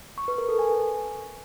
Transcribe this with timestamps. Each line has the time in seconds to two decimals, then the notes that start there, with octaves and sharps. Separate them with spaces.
0.18 C#6
0.28 B4
0.38 A#4
0.49 A4
0.59 G#5